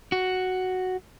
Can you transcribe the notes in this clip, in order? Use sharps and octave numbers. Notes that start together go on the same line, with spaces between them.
F#4